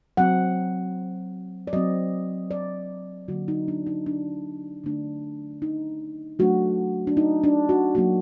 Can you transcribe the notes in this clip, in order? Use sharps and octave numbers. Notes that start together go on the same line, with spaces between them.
F#3 C4 F#5
D5
F#3 C4 D#5
D5
D3 F#3 A#3 F#4
D#4
D4
D#4
D4
D3 A3 D4
D#4
F#3 A3 D4 F#4
D4
D#4
D4
F#4
F#3 A#3 D4 F#4